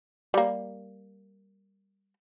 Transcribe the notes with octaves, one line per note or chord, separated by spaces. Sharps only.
G3 A#3